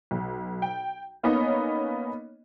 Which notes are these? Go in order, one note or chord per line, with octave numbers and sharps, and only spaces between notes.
B1
G5
A#3 B3 C#4 D#4 C#5 D#5